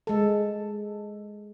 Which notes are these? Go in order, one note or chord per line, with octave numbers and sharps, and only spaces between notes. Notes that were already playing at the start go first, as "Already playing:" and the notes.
G#3 A4